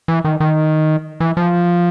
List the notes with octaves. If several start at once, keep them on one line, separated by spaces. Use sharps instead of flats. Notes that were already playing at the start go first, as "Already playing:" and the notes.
E3
D#3
D#3
E3
F3